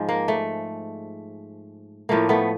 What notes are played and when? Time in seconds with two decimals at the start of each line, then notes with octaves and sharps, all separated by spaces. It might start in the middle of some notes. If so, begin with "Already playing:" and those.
Already playing: G#2 F3 G#3
0.09 A#3
0.28 A3
2.09 A2 F3 A3 A#3
2.29 A3 B3